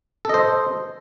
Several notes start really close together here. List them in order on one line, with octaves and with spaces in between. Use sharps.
A4 D#5 C5